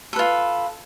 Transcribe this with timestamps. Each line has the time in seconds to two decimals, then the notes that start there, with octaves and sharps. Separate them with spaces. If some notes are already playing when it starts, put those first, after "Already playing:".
0.13 A4
0.16 B4
0.19 F4